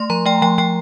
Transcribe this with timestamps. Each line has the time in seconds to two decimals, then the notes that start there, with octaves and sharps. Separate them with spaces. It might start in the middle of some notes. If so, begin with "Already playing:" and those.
Already playing: A3 C6
0.10 F3 A#5
0.26 A3 G5
0.42 F3 G5
0.58 F3 G5